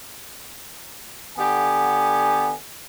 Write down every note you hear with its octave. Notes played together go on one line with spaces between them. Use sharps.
D3 B3 G4 G#5